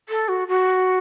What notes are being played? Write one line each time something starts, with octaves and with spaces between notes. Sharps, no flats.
A4
F#4
F#4